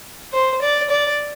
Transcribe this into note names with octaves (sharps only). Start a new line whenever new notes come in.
C5
D5
D5